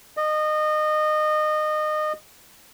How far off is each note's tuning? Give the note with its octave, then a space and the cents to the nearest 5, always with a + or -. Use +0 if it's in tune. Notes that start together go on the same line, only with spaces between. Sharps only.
D#5 -25